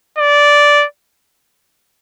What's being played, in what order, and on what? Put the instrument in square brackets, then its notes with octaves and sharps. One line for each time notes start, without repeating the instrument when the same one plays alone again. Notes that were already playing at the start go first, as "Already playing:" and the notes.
[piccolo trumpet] D5